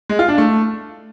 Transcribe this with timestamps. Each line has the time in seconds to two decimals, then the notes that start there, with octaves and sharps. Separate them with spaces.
0.09 G#3
0.19 F4
0.28 D4
0.38 A3